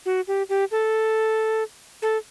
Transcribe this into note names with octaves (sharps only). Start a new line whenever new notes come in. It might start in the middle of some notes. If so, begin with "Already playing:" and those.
F#4
G4
G4
A4
A4